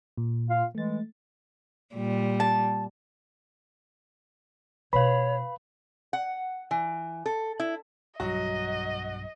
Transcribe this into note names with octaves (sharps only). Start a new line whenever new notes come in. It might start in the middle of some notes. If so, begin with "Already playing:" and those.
A#2
F4 F5
E3 G#3 A3 A6
A#2 G3
A5
B2 F4 B4 C#5 F5 B5
F#5
E3
A4
E4
B1 G2 F#3 G3 F#4 D#5